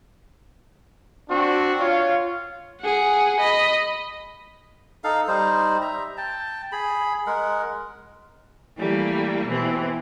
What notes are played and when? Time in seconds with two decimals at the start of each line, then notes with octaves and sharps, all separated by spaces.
1.29 C4 D4 F#4
1.79 F4 C#5 F5
2.82 G#4 F#5
3.40 D#5 B5
5.04 D#4 A4 F5
5.28 G3 D#4 C5
5.81 E5 A#5
6.17 G5 A5
6.72 G#4 B5
7.27 G#3 A#4 F#5
8.77 E3 G3 A3 A#3
9.47 B2 E3 C4